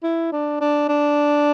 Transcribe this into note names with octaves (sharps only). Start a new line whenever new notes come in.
E4
D4
D4
D4